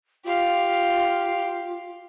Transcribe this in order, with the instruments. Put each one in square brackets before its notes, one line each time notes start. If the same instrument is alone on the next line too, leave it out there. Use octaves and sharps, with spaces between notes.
[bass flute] F4 [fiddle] G4 F5